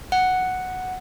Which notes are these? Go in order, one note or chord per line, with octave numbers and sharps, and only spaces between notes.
F#5